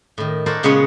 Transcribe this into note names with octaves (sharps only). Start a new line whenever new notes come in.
A2 D#3
F#4 A4 A#4 C5 D5
A#2 C#3 G#3 B3 C#4 C#5